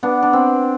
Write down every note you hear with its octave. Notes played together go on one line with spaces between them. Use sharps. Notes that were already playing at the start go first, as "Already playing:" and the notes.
B3 D4
D4
C4